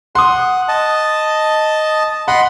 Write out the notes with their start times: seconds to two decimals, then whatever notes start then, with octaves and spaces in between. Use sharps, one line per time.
0.15 F#5 C6 D#6
0.68 D#5 A5
2.28 D#5 F#5 B5 C6